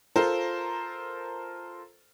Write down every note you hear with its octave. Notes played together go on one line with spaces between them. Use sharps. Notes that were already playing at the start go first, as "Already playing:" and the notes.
F4 A4 A#4 C5